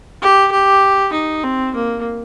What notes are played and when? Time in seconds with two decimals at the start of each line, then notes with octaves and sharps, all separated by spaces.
0.22 G4
0.52 G4
1.13 D#4
1.44 C4
1.75 A#3